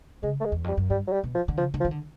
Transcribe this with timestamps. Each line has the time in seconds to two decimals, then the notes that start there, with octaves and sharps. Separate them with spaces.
0.23 C#3 G#3
0.40 A3
0.45 G#3
0.52 E2
0.64 F2 G3
0.77 F#2
0.90 G2 G3
1.07 F#3
1.13 G3
1.24 B2
1.35 F3
1.48 D3
1.57 C#3 F3
1.74 D3
1.80 F3
1.85 D#3
1.91 D3